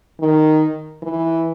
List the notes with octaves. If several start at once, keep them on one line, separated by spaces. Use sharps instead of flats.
D#3
E3